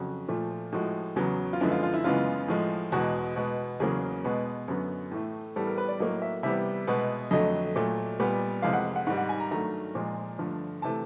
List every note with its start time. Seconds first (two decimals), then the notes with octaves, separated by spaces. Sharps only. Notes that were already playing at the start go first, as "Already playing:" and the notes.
Already playing: F2 C#3 F#3 F#4
0.28 A#2 F3 A3
0.72 A2 F3 G#3 F#4
1.16 E2 C#3 F#3 B3
1.53 F4
1.61 F#2 D3 F3 G#3 B3 E4
1.71 F4
1.83 F4
1.94 E4
2.04 F#2 C#3 E3 G#3 B3 F4
2.48 A2 F3 G#3
2.92 E2 B2 G#3 F#4
3.36 B2 G#3 B3
3.80 E2 C#3 F#3 A#3 G#4
4.24 B2 G#3 B3
4.68 F#2 D3 F#3 B3
5.12 A2 E3 A3
5.56 A2 E3 G3 B3 A4
5.67 A#4
5.78 B4
5.88 D5
5.99 A2 F#3 A#3 D#5
6.22 E5
6.43 C3 E3 G3 B3 E5
6.87 B2 G#3 B3
7.31 F2 D3 F#3 A3 D#5
7.76 A#2 F#3 A3
8.20 A#2 G3 B3
8.62 F2 C3 E3 G#3 F5
8.73 F#5
8.96 F#5
9.07 G#2 D#3 G3 F#5
9.18 F#5
9.29 G#5
9.40 A#5
9.51 G2 D#3 F#3 A3 A#5
9.95 A#2 F3 G#3
10.38 G2 D3 F3 A3
10.82 C3 E3 A3 A5